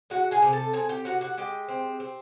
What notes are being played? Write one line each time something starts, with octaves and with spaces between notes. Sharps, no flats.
G#3 F#4 F#5
G#4 G#5
C3
A4 A5
C4 G#4 G#5
G4 G5
C3 F#4 F#5
F#4 F#5
G#3 G4 G5
C4
C4